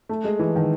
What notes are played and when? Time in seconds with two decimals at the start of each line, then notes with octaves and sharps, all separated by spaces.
0.09 A3
0.24 G#3
0.39 E3
0.56 D#3